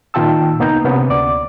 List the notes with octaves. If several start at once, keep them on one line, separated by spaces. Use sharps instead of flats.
A#2 D#3 F4 G5 A5 E6
C2 A#3 B3 D#4 A#5 G6
C3 A#3 B3 C#4
D2 D5 D6